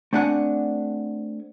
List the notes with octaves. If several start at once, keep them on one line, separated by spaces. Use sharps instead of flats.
A3 C4 D4 F#4 F#5 G#5